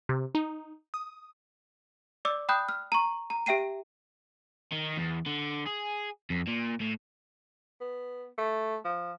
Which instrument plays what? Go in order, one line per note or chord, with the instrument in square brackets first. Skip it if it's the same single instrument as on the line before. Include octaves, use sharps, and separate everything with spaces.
[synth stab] C3
D#4
D#6
[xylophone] D5 D6 E6
G5 B5 D#6 F#6 G6
F6
A#5 C#6
A#5
G4 E5 G5 C7 D#7
[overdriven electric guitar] D#3
E2
D3
G#4
F2
A#2
A2
[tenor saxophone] B3
A3
F3